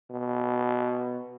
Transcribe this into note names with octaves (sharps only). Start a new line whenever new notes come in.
B2